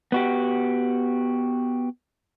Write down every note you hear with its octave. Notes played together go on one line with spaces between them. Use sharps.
B3 F#4 G4